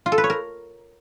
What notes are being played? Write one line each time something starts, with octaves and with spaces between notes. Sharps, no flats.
F4
A4
B4
C#5
A#4